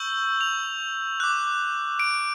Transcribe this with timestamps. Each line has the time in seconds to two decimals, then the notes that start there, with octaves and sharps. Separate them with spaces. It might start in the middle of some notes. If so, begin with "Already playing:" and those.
Already playing: C#6 E6 G6 F#7
0.41 F7
1.20 D6 F#6
1.99 D7